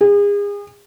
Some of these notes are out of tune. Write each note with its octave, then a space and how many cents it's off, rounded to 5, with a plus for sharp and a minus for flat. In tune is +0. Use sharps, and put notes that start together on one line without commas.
G#4 -35